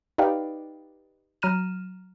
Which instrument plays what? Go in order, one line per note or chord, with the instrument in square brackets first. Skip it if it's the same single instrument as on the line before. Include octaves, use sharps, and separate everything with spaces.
[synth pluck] D#4 G4 B4 D5 F5 G5
F#3 A#5 F6 D#7 E7